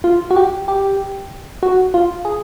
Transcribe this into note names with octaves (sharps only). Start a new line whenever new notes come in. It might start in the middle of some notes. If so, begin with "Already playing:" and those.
F4
F#4
G4
G4
F#4
F4
G#4